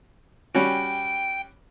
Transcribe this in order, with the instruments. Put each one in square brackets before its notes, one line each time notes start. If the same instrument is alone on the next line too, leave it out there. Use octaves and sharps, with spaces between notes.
[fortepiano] G3 C#4 F#4 [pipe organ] G5